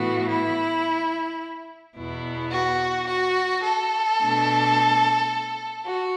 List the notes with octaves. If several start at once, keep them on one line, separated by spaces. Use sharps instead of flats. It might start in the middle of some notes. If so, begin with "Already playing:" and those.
Already playing: A2 E3 B3 F#4
E4
E2 B2 B3 E4
F#4
F#4
A4
B2 A3 D4
F#4